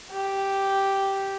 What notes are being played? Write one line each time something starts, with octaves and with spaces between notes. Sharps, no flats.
G4